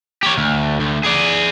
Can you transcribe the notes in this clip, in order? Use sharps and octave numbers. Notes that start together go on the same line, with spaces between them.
G4 C#5
D2
D2
G#4 D5